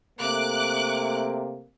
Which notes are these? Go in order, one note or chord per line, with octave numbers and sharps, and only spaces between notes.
C3 A3 A#3 D6 F#6